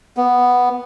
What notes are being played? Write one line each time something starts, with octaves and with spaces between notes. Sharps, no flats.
B3